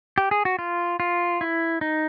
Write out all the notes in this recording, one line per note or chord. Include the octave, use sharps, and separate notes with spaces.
G4
G#4
F#4
F4
F4
E4
D#4